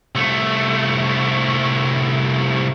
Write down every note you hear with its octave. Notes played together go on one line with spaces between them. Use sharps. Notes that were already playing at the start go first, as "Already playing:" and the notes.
C2 A3